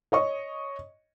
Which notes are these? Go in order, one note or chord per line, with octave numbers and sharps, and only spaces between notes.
C#5 D#5 C#6